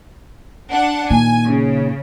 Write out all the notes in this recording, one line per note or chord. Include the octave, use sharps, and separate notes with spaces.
D4 F#5
A#2 D#3 G#5
C#3